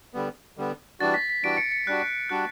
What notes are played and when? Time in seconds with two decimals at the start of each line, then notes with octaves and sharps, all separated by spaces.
0.14 D3 G3 B3
0.57 D3 G3 B3
1.00 E3 G3 D4 F#4 A6
1.14 B6
1.30 B6
1.43 E3 G3 D4 F#4 D7
1.57 C#7
1.72 C#7
1.87 G3 D4 F#4 F#6
2.29 G3 D4 F#4 F#6